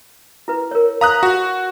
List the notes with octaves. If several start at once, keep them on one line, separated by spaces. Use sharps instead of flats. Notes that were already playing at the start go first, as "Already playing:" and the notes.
E4 B4
A#4 C#5
F5 A#5 D#6 F#6
F#4 F#5